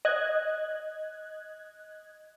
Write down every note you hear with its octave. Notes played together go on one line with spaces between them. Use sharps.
D#5 F#6 G#6